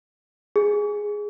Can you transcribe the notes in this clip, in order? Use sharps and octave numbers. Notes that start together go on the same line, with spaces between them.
G#4